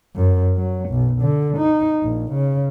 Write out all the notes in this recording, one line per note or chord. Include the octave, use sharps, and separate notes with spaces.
F#2
F#3
B1
D3
D#4
A#1
C#3